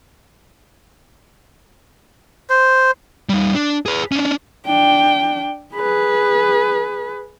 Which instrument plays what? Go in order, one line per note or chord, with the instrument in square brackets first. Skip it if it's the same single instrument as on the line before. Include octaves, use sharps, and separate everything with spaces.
[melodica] C5
[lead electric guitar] G3 D#4
D4
G#4 B4
C#4 D4
[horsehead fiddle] D4 G5
G#4 B4